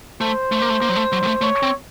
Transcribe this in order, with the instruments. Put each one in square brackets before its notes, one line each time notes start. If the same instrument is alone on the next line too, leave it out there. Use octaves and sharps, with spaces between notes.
[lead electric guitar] A3 [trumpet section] C5
[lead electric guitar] A3
A#3
A3
A#3
F#3
A3
F#3
F#3
A3
[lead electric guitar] A3 [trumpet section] C#5
[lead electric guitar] C4